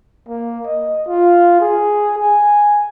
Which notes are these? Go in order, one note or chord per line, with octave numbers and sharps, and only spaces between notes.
A#3
D#5
F4
G#4
G#5